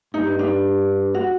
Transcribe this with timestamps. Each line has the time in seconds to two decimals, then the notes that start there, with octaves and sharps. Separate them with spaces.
0.14 G2 D#4
0.39 D4
1.14 F#4